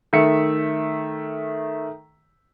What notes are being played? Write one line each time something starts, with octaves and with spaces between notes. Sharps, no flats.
D#3 A3 E5 C#7